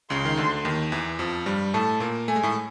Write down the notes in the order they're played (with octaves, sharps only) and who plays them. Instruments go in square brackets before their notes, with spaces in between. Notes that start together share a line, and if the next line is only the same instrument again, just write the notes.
[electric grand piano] C#2 C#3 [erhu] C6
[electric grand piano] D#3
D2 D3
D#2 D#3
E2 E3
F2 F3
G2 G3
[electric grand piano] A2 A3 [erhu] A5
[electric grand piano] A#2 A#3
[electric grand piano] A3 [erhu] G#5
[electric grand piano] G#3
A2 A3